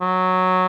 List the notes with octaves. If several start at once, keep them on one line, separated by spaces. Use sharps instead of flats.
F#3